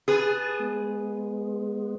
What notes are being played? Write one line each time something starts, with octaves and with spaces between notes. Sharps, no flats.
G#4 B4 A5 D#6
G#3 B3